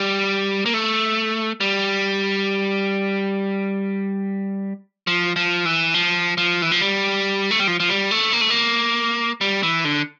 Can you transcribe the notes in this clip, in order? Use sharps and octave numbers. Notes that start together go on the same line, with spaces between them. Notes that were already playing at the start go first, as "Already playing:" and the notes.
Already playing: G3
A#3
A3
G3
F3
F3
E3
F3
F3
E3
F3
G3
A3
G3
F3
F3
G3
A3
A#3
A3
A#3
G3
E3
D3